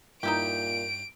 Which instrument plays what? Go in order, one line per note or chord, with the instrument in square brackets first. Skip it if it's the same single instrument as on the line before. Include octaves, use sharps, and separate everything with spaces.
[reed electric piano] G2 G6 [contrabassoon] A#2 [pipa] D#4 E4 G4 [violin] D7